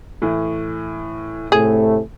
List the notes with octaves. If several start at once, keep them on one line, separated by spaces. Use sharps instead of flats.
A2 E3
A2 C3 A3 G#4